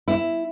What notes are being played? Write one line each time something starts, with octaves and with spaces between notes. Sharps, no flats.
E4